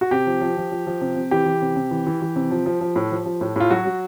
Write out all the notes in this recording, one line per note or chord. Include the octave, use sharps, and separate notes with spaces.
F#4
C3 G4
F3
F3
F3
F3
F3
C3
C3
E3 G4
E3
C3
C3
E3
E3
E3
C3
F3
F3
F3
A2
F3
F3
A2
A2 F4
F#3 F#4
F#3